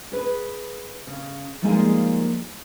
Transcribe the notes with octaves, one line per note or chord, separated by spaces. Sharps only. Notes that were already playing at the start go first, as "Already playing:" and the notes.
G#4 B4
C#3
F3 G3 G#3 A#3 D#4 G#4